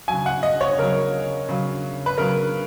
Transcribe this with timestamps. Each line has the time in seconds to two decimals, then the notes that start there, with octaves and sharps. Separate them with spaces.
0.08 C#3 F#3 G#5
0.26 F#5
0.43 D#5
0.61 C#5
0.78 C#3 F#3 A#4
1.49 C#3 F#3
2.06 B4
2.18 C#3 F#3 A#4